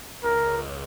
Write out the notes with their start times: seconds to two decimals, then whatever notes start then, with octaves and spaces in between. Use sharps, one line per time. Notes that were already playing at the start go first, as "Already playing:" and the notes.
0.24 C#2 A#4